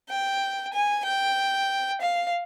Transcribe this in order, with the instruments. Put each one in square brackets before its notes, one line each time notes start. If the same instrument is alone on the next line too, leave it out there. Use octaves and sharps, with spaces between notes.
[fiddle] G5
G#5
G5
F5